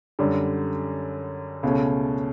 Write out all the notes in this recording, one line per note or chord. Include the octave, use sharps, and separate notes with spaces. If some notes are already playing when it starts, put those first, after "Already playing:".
F#2 D3 G3
C#2 B2 A3 C#4